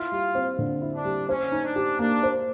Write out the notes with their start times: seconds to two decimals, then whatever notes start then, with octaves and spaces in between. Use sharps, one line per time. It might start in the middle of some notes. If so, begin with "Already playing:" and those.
Already playing: E4 F4
0.12 G3
0.35 C4
0.59 D3
0.82 E4
0.94 D4
1.05 G3
1.29 C#4 C5
1.52 D#4
1.64 D4
1.76 G4
1.99 A#3 D4
2.23 C5